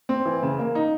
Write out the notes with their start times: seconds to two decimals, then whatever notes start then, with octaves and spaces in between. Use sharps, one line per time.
0.09 C4
0.25 E3
0.43 C#3
0.59 A#3
0.75 D#4